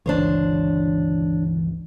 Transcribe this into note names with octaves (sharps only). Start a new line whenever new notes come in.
G1 C#2 E3 D4 C5 C#5